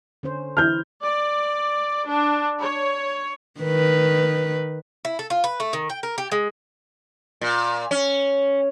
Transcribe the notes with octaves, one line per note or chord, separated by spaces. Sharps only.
D3 C#4 C5
D3 E3 E4 F6 G6
D5
D4
C#5
D#3 B4
E4
A4
F4
B4
A3
D#3
G5
A#4
G4
G#3
A#2
C#4